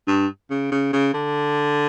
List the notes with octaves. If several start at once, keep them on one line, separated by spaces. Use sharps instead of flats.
G2
C#3
C#3
C#3
D3